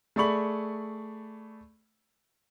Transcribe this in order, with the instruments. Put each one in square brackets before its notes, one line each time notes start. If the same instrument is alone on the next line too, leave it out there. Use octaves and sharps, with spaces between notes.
[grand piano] A3 G#4 D5 B5 C#6 F#7